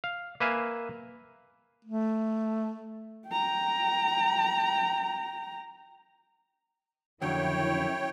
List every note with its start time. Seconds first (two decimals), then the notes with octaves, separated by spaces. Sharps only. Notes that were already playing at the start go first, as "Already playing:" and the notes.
0.04 F5
0.40 A#3 B4 E5 F5 G#5
1.85 A3
3.28 G5 A#5
7.22 F2 D3 D#3 F#3 C#4 E4 C#5 G5